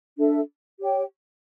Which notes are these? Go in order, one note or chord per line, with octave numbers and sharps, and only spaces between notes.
D4 A4 E5
G4 C#5 G5